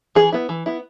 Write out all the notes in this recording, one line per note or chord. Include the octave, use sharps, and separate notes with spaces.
E3 G#4
B3 E4
E3
B3 E4